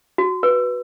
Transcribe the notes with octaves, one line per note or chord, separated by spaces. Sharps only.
F#4
B4